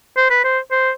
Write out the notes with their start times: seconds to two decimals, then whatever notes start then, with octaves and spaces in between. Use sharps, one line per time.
0.17 C5
0.31 B4
0.44 C5
0.72 C5